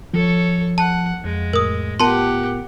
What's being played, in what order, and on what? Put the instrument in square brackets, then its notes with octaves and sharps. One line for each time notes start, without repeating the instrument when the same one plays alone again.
[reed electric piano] F3 [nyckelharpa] A4 C#5
[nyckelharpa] F#5 [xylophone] A5
[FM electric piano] F2 [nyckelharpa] G#3
[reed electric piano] A2 [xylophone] A#4 D#6
[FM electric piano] B3 F4 A#4 [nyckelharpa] G4 F#5 [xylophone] A5 C6